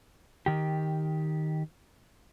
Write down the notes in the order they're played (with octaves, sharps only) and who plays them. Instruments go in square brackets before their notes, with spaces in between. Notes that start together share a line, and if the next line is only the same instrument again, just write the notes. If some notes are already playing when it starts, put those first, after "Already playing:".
[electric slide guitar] D#3 G4